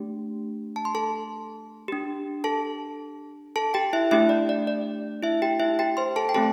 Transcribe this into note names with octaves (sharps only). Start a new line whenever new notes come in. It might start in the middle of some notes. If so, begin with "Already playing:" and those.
Already playing: A3 D4 G4
A5
C6
A4 A5
D4 G4
A4 A5
A4 A5
G4 G5
E4 E5
A3 D4 E4 G4 E5
D5
D5
D5
E4 E5
G4 G5
E4 E5
G4 G5
C5 C6
A4 A5
G5
A3 C4 G4 A4 A5